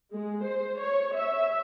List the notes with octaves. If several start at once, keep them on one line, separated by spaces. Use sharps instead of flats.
G#3
C5
C#5
E5